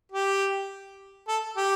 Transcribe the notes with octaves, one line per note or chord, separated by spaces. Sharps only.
G4
A4
G4